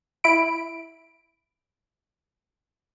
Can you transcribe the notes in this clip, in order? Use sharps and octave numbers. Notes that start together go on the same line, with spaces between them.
E4 B5 D7